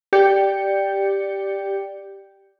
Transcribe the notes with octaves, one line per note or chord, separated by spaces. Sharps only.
G4 D5 G5 G6 C#7